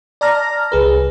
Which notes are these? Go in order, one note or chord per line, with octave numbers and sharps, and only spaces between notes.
D5 A5 A#5 F6 A#6
C2 G#4 B4